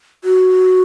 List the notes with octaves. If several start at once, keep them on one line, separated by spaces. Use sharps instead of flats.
F#4